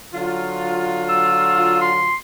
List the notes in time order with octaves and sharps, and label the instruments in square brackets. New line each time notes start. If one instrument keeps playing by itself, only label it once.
[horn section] D3 F#3 F4
[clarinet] E6
C6